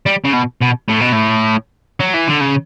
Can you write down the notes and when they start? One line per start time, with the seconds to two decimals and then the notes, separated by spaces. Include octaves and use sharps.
0.06 G3
0.25 C#3
0.33 B2
0.62 B2
0.89 A2
1.01 B2
1.13 A2
2.00 F#3
2.14 E3
2.28 D3
2.41 C#3